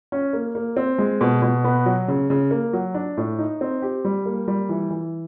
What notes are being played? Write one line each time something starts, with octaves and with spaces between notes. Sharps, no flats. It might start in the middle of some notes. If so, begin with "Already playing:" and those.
C#4
A#3
A#3
C4
G#3
B2
B2
B3
F#3
C#3
C#3
A#3
F#3
D4
A2
D#4
C4
G4
G3
A#3
G3
E3
E3